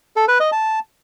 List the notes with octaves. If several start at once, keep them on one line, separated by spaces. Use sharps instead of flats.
A4
B4
D#5
A5